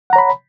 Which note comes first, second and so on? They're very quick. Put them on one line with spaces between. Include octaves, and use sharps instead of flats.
F#5 A#5 C#5 B5